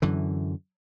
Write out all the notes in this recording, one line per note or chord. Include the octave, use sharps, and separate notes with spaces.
F#2 D3 E3